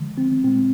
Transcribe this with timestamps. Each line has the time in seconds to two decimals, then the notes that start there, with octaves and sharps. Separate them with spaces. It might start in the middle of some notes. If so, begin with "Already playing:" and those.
Already playing: D3 F3 G#3
0.18 C4
0.44 A#2 G#3 C4